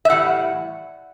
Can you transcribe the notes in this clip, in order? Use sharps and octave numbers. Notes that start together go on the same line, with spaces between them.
E5
A2 E3 G3 F#5